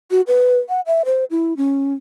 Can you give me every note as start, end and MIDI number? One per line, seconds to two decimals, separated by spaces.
0.11 0.21 66
0.27 0.57 71
0.69 0.81 78
0.86 1.02 76
1.05 1.25 72
1.31 1.57 64
1.57 1.94 61